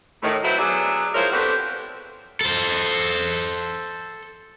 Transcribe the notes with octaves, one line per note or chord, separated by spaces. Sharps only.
A2 D#3
F#3 A3 E4 B4 C5
F#3 B3 D4 G#4 D5 E5
F3 G#3 E4 A#4 C5 C#5
B3 C4 D4 F#4 G4 A4
A4 C5